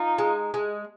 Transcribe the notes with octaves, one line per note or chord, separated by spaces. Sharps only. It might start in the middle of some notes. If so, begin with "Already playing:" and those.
Already playing: D#4 F4
G#3
G#3